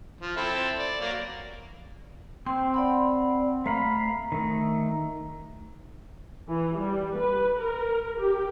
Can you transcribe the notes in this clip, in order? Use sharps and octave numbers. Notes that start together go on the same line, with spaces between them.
F3
C4 E4 A4
D5
F#3 A#3 D5
C4 C5 G5 C6
D5 F#5 B5
A3 F5 A#5 B5
D#3 A3
E3
G3
B4
A#4
G4